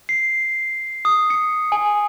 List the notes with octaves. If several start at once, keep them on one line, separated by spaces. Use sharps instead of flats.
C7
D#6
C#7
G#5